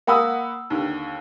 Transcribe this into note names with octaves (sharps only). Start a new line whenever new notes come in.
A#3 F#5 B5 D#6 E6
D#2 D3